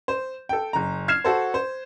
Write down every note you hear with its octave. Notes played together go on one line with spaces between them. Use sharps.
C5
A4 G5
F#1 A#5
F6 G#6 C7 E7
F#4 A4 C5
C5